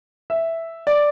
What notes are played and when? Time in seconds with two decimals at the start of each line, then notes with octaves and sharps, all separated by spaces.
0.30 E5
0.87 D5